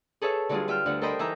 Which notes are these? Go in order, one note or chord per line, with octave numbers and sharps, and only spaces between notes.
G#4 A4 B4 C#5 E5
D3 F#3 G3 D4 F4 G#4
F4 E5 G5 F6
D2 D3 F#5
A4 A#4 C5 D#5 G5 B5
E3 D#4 E5 A#5 G6